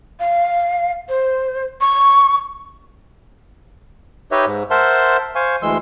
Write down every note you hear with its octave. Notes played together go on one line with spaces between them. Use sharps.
F5
C5
C#6
D#4 G4 B4 C#5 D#5 E5
G#2
A#4 C5 E5 F#5 A5 C6
C5 F5 G#5 C#6
D2 E3 G#3 C6 E6